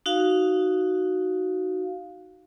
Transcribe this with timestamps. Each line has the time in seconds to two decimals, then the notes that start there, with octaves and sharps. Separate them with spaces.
0.06 D#4 F#4 F5